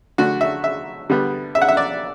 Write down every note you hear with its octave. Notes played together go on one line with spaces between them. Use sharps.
D3 A3 F#4
E5
E5
D3 G3 B3
E5
F#5
E5
D5